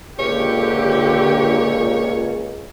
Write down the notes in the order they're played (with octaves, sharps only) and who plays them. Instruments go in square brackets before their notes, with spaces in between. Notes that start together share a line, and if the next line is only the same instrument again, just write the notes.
[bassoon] C#2 [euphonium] A#2 [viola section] D3 G4 [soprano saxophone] C#5